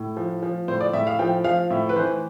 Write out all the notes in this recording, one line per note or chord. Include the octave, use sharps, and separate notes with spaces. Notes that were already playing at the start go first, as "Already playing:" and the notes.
Already playing: A2
F3
F3
A2 C5
D5
A2 E5
F5
F3 G5
F3 F5
A2 E5
B4
E3 C5